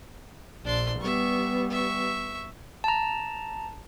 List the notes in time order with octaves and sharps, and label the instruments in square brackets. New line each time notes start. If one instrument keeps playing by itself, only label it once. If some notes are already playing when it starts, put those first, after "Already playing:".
[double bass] A#1 [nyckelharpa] D4 C6
[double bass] G3 B3 [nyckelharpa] E5 C#6
[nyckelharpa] E5 C#6
[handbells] A5 A#5